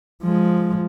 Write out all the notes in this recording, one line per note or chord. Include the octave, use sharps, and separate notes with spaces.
F3 G#3